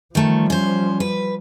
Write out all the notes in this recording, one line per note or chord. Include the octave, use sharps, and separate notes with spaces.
D#3 F3 G3 A3
C#4 C5
B4